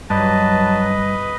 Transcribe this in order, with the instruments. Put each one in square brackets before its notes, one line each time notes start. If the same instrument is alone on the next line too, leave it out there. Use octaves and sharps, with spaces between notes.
[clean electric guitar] G2 [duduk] F#3 [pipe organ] B4 D#5 [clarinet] A5